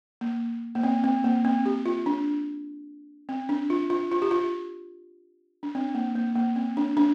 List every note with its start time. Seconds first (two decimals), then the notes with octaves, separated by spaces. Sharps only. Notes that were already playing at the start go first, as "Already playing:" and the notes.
0.21 A#3
0.75 A#3
0.83 C4
1.04 C4
1.24 A#3
1.45 C4
1.66 G4
1.86 F4
2.06 D4
3.29 C4
3.49 D4
3.70 F4
3.90 F4
4.11 F4
4.22 G4
4.31 F4
5.63 D4
5.75 C4
5.95 A#3
6.15 A#3
6.36 A#3
6.56 C4
6.77 D4
6.97 D4